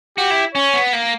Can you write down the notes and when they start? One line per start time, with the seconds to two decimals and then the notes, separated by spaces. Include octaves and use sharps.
0.18 F#4 G4
0.30 E4
0.55 C#4 C#5
0.74 B3
0.93 A#3